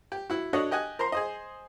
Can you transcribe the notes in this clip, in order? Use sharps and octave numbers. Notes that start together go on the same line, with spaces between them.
G4
E4 F#4
D4 F#4 A4 C#5 D#5
G4 D#5 F#5 G#5
A#4 C5 A#5 C6
G#4 C5 D#5